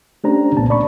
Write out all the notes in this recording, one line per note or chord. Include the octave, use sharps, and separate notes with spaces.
A3 C#4 D4 G4 C5 A#5
C2 A#2 B3 A5
D5 B5 C#6